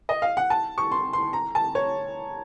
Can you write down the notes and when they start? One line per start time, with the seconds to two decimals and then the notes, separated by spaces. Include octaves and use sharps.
0.09 D#5
0.22 F5
0.37 F#5
0.50 A5
0.78 C#6
0.92 C6
1.13 C6
1.33 A#5
1.55 A5
1.75 C#5